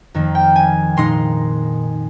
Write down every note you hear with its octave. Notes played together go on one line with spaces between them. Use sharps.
F2 D#3 A#3
G5
G#5
A#2 G#3 D#4 C6